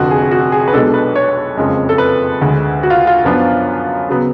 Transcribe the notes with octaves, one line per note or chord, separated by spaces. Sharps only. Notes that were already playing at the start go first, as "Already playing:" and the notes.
Already playing: F1 F2 D3 F#4
G#4
F#4
G#4
B4
B1 B2 G#3 D4 A4
B4
C#5
F#1 F2 C#3 G#3 C#4
A4
B4
D2 D3 G#3
F#4
F4
F4
F#2 F3 B3 D4
C#3 F#3 B3